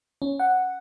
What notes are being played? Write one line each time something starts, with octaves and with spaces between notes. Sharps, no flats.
C#4
F#5